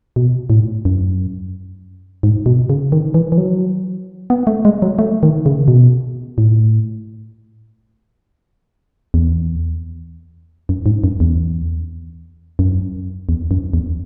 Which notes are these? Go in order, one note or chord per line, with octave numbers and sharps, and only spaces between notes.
B2
A2
F#2
G#2
B2
C#3
D#3
E3
E3
F#3
B3
A3
G#3
F#3
A3
D#3
C#3
B2
A2
E2
F#2
G#2
F#2
E2
F#2
E2
F#2
E2